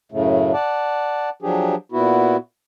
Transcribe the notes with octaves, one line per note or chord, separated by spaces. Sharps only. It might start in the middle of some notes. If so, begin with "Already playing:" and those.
F#2 A2 C#3 A3
D5 F#5 A5
F3 F#3 D4 G4 G#4
A#2 B3 E4 F#4